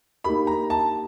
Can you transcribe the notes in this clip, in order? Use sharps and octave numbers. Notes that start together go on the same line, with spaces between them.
A#3 D#4 G4 A#4 B5
A#5
A5